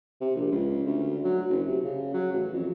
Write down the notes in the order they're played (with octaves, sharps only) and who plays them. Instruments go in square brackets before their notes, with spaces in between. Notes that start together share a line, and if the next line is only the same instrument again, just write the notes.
[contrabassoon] C3
A#1
C#2
D2
F#3
F#1
C3
C#3
F#3
A1
F2